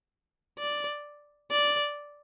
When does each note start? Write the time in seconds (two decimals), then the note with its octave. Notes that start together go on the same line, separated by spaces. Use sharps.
0.59 D5
1.51 D5